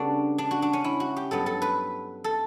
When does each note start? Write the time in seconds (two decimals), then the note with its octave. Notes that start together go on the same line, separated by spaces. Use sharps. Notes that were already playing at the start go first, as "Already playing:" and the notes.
Already playing: C#3 G3 B3 D4 F#4 A4
0.38 D4
0.51 F#4
0.62 D4
0.73 C#4
0.84 E4
1.00 F#4
1.16 G4
1.31 G2 F#3 B3 A4
1.46 A4
1.62 B4
2.24 A4